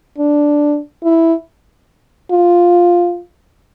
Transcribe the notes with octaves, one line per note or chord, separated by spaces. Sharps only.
D4
E4
F4